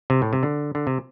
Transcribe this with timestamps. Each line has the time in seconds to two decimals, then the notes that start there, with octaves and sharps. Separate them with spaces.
0.10 C3
0.22 A2
0.33 C3
0.43 D3
0.75 D3
0.87 C3